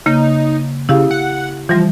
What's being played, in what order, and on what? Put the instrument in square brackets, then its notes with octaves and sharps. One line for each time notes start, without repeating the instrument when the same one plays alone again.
[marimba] C#3 A#3 [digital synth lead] D#4
[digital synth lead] C#3 [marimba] E4 G4 F5
[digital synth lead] F#5
[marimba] E3 G3 [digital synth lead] F3